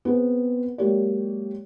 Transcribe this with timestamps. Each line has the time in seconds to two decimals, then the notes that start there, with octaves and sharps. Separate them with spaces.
0.05 B3 C4 G#4
0.78 F#3 G#3 A#3 G4 C#5 D5